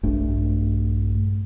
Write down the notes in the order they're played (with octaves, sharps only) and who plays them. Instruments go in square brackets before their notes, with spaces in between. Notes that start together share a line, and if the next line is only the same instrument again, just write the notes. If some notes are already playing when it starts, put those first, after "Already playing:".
[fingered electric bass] A#1 G2 A3 D4